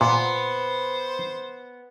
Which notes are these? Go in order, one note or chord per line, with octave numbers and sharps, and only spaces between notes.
A#2 B3 C5 C6